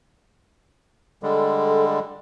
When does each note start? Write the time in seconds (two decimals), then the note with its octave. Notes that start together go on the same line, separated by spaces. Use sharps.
1.23 D3 G3 G#3 A4